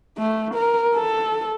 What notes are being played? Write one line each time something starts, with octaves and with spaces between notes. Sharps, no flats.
A3
A#4
A4